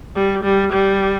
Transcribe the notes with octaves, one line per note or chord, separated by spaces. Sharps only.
G3
G3
G3